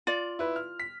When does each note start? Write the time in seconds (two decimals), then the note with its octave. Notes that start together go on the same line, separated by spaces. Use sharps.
0.07 F4 D5
0.39 E4 B4
0.56 F6
0.79 B6